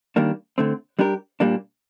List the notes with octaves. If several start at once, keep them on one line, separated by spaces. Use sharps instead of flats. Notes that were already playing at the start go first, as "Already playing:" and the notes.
D#3 G3 A#3 D4
D3 A3 C4
G3 D4 G4 A#4
A#2 G3 A#3 D4